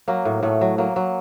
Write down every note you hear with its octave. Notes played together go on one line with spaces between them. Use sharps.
F#3 A#3
A2
A2 A3
F#3
F#3 A#3
F#3